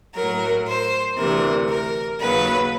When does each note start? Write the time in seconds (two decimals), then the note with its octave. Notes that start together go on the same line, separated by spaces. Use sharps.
0.15 A2 F#3 A#4
0.66 C5
1.17 D2 C3 E3 A#4
1.69 A#4
2.20 D#2 C#3 F#3 B4